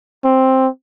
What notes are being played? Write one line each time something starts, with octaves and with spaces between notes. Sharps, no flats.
C4